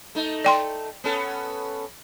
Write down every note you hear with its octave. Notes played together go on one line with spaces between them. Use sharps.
A3 D#4
D5 G5 C6
B3 C#4 A4